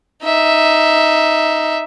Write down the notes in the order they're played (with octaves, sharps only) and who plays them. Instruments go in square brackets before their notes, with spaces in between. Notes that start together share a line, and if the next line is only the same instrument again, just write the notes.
[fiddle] D#4 E5